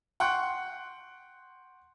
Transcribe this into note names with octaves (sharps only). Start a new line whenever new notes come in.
F#5 G5 C6 C#6 F#6